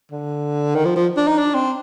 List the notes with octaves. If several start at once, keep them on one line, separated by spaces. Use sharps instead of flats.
D3
D#3
F3
F3
D4
D#4
D4
C4